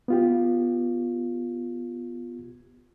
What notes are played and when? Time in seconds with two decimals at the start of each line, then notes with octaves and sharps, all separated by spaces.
0.08 B3 F4 G4